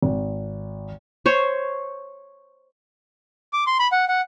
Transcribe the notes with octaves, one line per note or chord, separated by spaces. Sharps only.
G#1
C5 C#5
D6
C6
B5
F#5
F#5